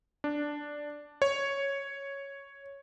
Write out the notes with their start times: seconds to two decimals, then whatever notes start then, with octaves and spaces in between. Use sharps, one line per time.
0.24 D4
1.22 C#5